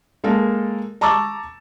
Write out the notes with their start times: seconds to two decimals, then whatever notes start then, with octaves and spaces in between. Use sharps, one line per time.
0.24 G#3 A#3 A4 A#4
1.01 A5 A#5 C#6 D6 E6 A6